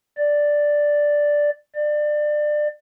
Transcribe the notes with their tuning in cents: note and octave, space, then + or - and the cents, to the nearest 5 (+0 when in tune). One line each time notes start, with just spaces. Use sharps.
D5 +0
D5 +25